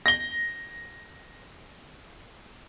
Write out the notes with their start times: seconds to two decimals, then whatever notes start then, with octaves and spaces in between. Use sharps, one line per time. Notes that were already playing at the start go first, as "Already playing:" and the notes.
0.06 A#6 G7